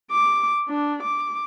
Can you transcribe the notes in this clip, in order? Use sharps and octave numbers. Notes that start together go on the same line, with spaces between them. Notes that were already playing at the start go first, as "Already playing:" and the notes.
D6
D4
D6